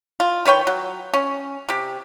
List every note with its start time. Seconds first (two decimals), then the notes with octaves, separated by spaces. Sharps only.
0.20 F4
0.45 D#3 B4 C#5 G5
0.67 F#3
1.14 C#4
1.69 C3 G4